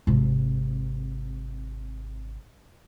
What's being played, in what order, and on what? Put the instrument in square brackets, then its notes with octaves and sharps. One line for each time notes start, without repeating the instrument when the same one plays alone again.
[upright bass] G#1 C3